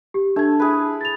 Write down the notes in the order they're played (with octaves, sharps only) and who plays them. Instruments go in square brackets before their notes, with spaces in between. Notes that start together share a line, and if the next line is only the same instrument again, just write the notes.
[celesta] G4
[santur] A3 [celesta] D4 G#6
[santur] E4 G#4 B4
[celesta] A6 F7